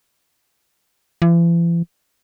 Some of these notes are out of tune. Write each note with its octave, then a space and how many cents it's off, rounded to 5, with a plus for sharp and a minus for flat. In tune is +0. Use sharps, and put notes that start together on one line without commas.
E3 +45